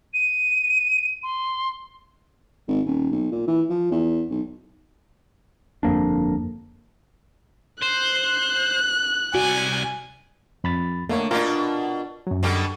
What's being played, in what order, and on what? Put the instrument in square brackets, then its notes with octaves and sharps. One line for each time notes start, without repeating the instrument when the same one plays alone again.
[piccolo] D#7
C6
[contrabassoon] G#1
D#1
B1
A#2
E3
F3
E2
B1
[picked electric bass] G1 F2 A#3 D4
[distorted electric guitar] C5 [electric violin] F#6
[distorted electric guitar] C2 D5 [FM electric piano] F#4 [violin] G#5
[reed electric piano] F2 B5 A6
[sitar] D3 [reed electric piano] A3 A#3 C#5
[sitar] B2 D4 [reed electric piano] F4 A#4
[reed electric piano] F#2 F#3
[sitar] B2 D3 G3